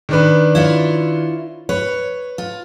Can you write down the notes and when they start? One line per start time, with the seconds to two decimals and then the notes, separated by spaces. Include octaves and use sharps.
0.09 D#3 D4 B4
0.55 E4 F4 C#5
1.69 B4 C#5
2.38 F4